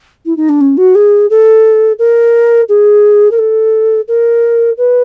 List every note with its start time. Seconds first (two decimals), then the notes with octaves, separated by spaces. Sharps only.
0.26 E4
0.37 D#4
0.49 D4
0.61 C#4
0.77 F#4
0.95 G#4
1.30 A4
1.99 A#4
2.69 G#4
3.31 A#4
3.38 A4
4.08 A#4
4.77 B4